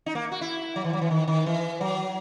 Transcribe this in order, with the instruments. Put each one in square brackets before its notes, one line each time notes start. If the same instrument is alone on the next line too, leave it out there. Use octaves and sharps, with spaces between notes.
[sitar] D#4
A#3
F#4
E4
F#3
E3
F#3
E3
D#3
D#3
E3
F#3